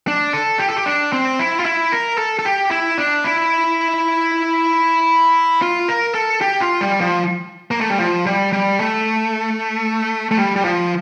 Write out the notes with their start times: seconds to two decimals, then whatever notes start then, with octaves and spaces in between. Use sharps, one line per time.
0.08 D4
0.33 A4
0.59 G4
0.69 A4
0.77 G4
0.86 D4
1.13 C4
1.39 E4
1.59 F4
1.65 E4
1.92 A#4
2.18 A4
2.39 A4
2.45 G4
2.71 E4
2.98 D4
3.24 E4
5.62 F4
5.88 A#4
6.15 A4
6.41 G4
6.61 F4
6.81 G3
7.01 F3
7.71 A#3
7.81 A3
7.90 G3
8.00 F3
8.26 G3
8.53 G3
8.79 A3
10.31 A3
10.37 G3
10.56 G3
10.64 F3